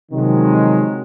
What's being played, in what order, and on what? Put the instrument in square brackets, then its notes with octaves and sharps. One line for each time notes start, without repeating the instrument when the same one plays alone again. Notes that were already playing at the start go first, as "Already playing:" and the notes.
[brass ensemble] C3 D#3 F3 F#3 G#3